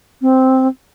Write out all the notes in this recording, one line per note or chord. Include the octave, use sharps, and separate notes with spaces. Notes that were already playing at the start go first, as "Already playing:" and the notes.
C4